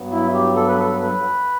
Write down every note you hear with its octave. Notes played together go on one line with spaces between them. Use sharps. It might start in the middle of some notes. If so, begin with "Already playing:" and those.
Already playing: G2 F#3 B3
E4
G4
A4
B4
A4
B4